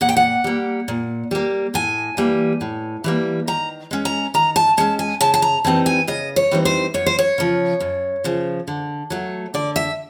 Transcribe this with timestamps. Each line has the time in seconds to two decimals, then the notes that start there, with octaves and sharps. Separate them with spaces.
0.01 A#2 F#5
0.09 G5
0.17 F#5
0.44 G3 A#3
0.88 A#2
1.31 G3 A#3
1.74 A2 G#5
2.17 E3 G3 A#3
2.61 A2
3.04 E3 G3 A#3
3.48 D#3 A#5
3.91 G#3 C#4
4.05 A#5
4.34 D#3 A#5
4.56 A5
4.77 G#3 C#4 A5
4.99 G#5
5.21 C#3 A5
5.34 A5
5.42 A#5
5.64 E3 G3 C4 D#4 A5
5.86 G#5
6.07 C#3 D#5
6.36 C#5
6.51 E3 G3 C4 D#4
6.65 C5
6.94 F#2 C#5
7.06 C5
7.19 C#5
7.38 C#3 F3
7.80 F#2
8.24 C#3 F3
8.68 D3
9.10 F#3 A3
9.54 D3 D5
9.76 E5